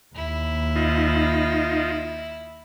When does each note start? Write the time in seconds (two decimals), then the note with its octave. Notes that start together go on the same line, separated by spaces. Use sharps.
0.15 D#2 E4
0.76 D#4 F4